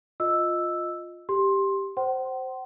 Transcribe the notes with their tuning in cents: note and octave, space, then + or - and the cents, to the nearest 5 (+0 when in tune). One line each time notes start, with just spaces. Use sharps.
F4 +10 D#5 +0 E6 +0
G4 +0 C6 +15
C5 +0 F#5 +45 C6 +0